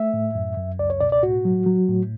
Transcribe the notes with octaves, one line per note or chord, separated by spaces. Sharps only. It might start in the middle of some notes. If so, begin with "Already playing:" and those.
Already playing: A3 E5
A2
F#2
F#2
C#2 D5
C#5
B2 D5
D5
A2 F#4
F#3
F#3
A2